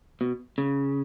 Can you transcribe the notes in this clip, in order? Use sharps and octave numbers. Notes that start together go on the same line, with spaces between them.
B2
C#3